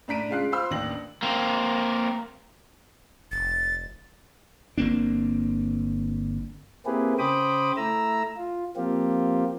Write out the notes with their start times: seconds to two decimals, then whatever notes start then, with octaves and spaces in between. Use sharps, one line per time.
0.08 A2 D4 A#5 B6 D7 D#7
0.29 C#3 G#3 F4 F5 F#6 C7
0.52 F4 C5 F5 B5 C6 E6
0.71 A1 D#2 D#3 D4 A#6 F#7
1.23 A#3 C4
3.32 F1 A6
4.78 G1 A#3 C4 D4
6.86 A#3 C4 E4 G4 G#4 B4
7.19 C#3 C5 G5 B5 D6 D#6
7.77 A3 E4 A#5 E6
8.37 F4
8.77 F3 A#3 C4 F4 G4